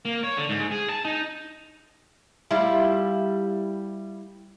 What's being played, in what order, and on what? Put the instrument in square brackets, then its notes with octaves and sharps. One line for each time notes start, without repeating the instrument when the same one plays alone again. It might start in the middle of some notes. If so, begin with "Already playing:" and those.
[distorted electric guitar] A#3
C#5
D3
G#2
G#4
A5
D#4
[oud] G3 E4 F4